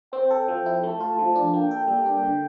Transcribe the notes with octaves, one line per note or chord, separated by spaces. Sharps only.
C4 G5
A4
F3
E4
A3 A5
F4
F3
D4
A#3 G5
A4
G3
D4
D3